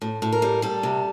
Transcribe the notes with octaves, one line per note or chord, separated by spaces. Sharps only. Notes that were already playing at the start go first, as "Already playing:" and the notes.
A2
A2
A#4
G3
G3 A4
C3